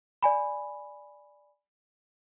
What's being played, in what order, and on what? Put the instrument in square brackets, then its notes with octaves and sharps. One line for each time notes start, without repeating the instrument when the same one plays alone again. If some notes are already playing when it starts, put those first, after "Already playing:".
[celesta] D5 G#5 B5